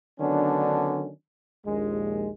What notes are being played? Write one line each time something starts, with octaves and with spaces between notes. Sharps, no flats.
D3 D#3 F#3 B3 C#4 D4
A#1 D#2 G#3